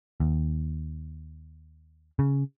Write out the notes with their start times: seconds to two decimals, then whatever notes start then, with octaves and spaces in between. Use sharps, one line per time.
0.20 D#2
2.19 C#3